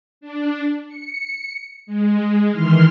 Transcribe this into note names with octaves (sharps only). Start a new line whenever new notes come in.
D4
C#7
G#3
D#3 E3 C6 F6